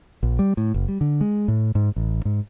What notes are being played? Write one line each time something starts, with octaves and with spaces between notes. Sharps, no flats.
A#1
G3
A2
F#1
G3
D3
G#3
A2
G#2
A1
G#2